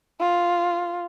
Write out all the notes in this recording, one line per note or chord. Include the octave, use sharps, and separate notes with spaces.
F4